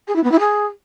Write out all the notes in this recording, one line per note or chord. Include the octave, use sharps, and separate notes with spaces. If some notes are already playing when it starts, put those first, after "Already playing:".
G#4
E4
B3
E4
G#4